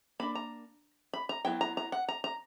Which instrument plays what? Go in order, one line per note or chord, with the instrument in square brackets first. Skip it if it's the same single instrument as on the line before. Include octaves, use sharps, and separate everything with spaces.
[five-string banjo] A#3 D4 B5
A#5
B5
A#5
F#3 B3 E4 G5
A#5
A#5
F#5
A#5
A#5